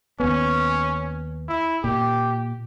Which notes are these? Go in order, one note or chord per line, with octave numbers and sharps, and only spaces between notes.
D#2 B3 C#4
E4
A#2 G4